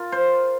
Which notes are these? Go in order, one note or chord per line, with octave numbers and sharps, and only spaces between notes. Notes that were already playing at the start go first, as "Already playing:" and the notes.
Already playing: F4 A#4
C5